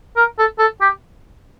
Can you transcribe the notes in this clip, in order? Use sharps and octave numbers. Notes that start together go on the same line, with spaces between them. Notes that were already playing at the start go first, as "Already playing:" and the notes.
A#4
A4
A4
G4